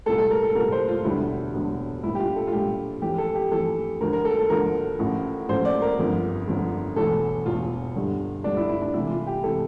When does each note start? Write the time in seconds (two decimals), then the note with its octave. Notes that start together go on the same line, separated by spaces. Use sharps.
0.06 C2 A#2 A3 A4
0.18 A4
0.31 A#4
0.43 A4
0.55 C2 A#2 A3 A#4
0.72 C5
0.88 F4
1.04 E1 D2 D3 G3 E4
1.54 E1 D2 D3 G3
2.03 A#1 A#2 G3 E4
2.15 G4
2.19 F4
2.36 A4
2.47 F4
2.52 A#1 A#2 G3 G4
3.02 F2 E3 A3 G4
3.18 A4
3.35 G4
3.51 F2 E3 A3 A4
4.01 D2 D3 F3 A#4
4.13 A#4
4.25 A4
4.37 A4
4.50 D2 D3 F3 A#4
4.99 A1 A2 F3 A3
5.49 A1 A2 F3 A3 C5
5.65 D5
5.82 A#4
5.98 G1 F2 D3
6.48 G1 F2 D3
6.96 E1 E2 E3 A3 A4
7.46 E1 E2 E3 A3 F4
7.95 G1 G2 D3 G3
8.44 G1 G2 D3 G3 D4
8.57 E4
8.69 E4
8.82 D4
8.94 C2 C3 E3 A3 E4
9.10 F4
9.27 G4
9.43 C3 E3 A3 A4